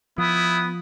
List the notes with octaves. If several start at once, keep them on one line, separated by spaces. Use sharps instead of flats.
F3 B3 E4 D#6